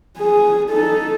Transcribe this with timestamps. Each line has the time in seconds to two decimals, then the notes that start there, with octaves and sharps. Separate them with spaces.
0.18 G#4
0.70 D#4 A4